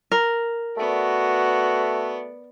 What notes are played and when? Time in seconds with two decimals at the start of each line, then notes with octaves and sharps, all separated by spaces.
0.11 A#4
0.77 A3 B3 F#4 D5